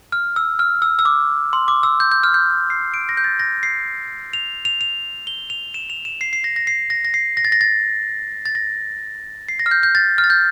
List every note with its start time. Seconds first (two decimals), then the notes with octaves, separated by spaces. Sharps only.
0.12 F6
0.36 E6
0.59 F6
0.82 E6
0.99 E6
1.05 D6
1.53 C6
1.68 D6
1.83 E6
2.00 G6
2.12 G6
2.23 F6
2.34 G6
2.70 C7
2.94 D7
3.09 A#6
3.17 G6
3.24 A6
3.40 A#6
3.63 C7
4.33 F7
4.65 F7
4.81 F7
5.27 G7
5.50 F7
5.74 E7
5.90 F7
6.05 E7
6.21 C7
6.33 C7
6.44 A#6
6.56 A#6
6.67 C7
6.90 A#6
7.05 A#6
7.14 C7
7.37 A#6
7.45 A6
7.52 A#6
7.61 A6
8.46 A6
8.55 A#6
9.49 C7
9.59 A#6
9.66 F6
9.71 G6
9.83 G6
9.95 A6
10.18 F6
10.24 A6
10.30 G6